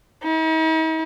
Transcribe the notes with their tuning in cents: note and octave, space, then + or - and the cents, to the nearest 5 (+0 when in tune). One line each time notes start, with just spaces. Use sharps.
D#4 +45